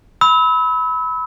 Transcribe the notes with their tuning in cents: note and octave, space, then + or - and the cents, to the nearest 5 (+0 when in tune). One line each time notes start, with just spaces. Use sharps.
B5 +5 E6 -35